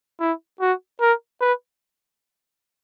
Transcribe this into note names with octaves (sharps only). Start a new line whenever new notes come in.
E4
F#4
A#4
B4